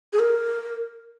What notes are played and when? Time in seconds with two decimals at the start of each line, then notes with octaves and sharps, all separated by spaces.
0.13 G#4
0.19 A#4